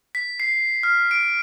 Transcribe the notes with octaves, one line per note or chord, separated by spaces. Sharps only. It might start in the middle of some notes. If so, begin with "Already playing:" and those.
B6
C7
F6
D7